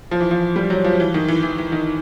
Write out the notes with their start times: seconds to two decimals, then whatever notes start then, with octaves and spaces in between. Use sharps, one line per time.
0.11 F3
0.20 E3
0.31 F3
0.56 G3
0.70 F#3
0.84 F3
1.00 E3
1.14 D#3
1.28 E3
1.43 E3
1.58 E3
1.72 D#3